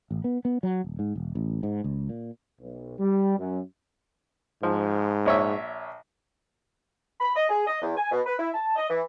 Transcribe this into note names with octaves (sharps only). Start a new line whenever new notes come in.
A1
B3
B3
F#3
D#1
G#2
E1
A1
G#2
C#2
A#2
B1
G3
F#2
G#2 F3
A#1 C#5 E5
B5
D#5
G#4
D#5
E2
G#5
B2
B4
E4
A5
D#5
E3